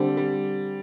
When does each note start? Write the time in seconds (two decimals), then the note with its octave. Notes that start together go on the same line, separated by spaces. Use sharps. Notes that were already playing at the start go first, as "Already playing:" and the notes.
Already playing: D3 G3 C4 A4 C5
0.17 G3